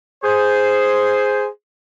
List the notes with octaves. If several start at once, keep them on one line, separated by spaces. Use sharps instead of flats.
G#4 C5